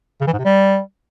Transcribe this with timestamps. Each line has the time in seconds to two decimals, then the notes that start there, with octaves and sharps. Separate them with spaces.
0.21 C#3
0.27 E3
0.33 G#2
0.39 C3
0.45 G3